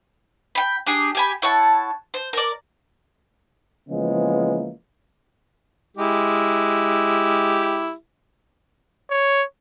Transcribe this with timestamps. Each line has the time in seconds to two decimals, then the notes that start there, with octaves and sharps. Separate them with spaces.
0.55 G5 B5
0.87 D4 G4 G#4
1.15 G4 G#5 B5
1.42 E4 C#5 F#5 A5
2.14 C5
2.33 A#4 D5
3.89 C#3 E3 F3 G#3 A#3 B3
5.97 G#3 E4 G4
9.10 C#5